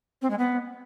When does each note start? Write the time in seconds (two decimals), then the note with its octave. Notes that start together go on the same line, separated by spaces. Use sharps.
0.22 C4
0.30 G#3
0.38 B3